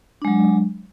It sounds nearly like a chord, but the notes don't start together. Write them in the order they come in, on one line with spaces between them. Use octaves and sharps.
D4 G#3 F#3